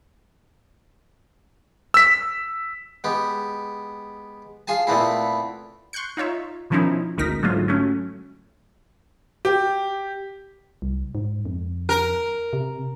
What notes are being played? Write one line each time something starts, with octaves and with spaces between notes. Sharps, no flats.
E6 B6
G#3 B3 G4
F4 G#4 G#5 A5
A#2 A3 B3 C4 E4
C6 C#6 F#6 G6 C#7
D#4 F4 C#5 E5
B2 D#3 F3 C#4 D#4 E4
G#1 D2 D#4 A#4 A#6 B6
G#2 D3 F#3 A3 F4
F#3 A3 C#4
G4
C2
G#2
F2
A#4
C3